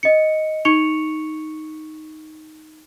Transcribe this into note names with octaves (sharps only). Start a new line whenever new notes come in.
D#5 C#7
D#4 C#6 C#7 F7